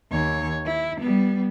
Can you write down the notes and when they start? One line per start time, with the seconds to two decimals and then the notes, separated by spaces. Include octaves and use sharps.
0.11 D#2 C#5
0.66 E4
1.01 G3 B3